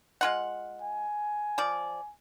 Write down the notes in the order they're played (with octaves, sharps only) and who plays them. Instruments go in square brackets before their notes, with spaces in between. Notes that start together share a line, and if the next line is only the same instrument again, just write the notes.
[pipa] G#3 F4 F#5
[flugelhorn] G#5
[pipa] F3 D5